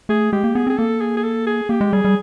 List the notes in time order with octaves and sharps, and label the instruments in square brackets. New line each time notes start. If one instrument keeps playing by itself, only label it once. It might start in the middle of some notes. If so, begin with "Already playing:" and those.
[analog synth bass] A3 [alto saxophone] G#4
[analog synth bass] G#3 [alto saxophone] G4
[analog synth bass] A#3
[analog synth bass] B3 [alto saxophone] G#4
[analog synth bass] C4 [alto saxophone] G#4
[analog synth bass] A#3 [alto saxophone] A4
[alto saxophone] G#4
G#4
A4
G#4
[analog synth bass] A#3 [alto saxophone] G4
[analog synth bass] G#3
[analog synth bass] G3 [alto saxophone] G#4
[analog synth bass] G3